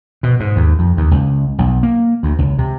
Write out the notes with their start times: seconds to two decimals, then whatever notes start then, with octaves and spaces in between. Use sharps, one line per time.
0.23 B2
0.40 G#2
0.56 D#2
0.79 F2
0.97 D#2
1.11 C#2
1.58 B1
1.83 A#3
2.23 D2
2.39 C#2
2.59 C3